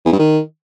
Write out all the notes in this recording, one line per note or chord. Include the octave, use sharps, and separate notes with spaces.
E2
G2
D#3